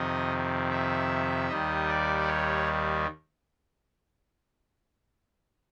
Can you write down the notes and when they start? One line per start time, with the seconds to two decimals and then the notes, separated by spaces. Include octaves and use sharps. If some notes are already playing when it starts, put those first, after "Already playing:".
Already playing: F2 C3 D#3 D#5
0.70 E5
1.49 D#2 D#3 G3 D#5
1.88 D5
2.27 C#5